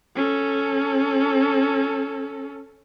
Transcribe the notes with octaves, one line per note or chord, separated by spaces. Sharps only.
C#4 A4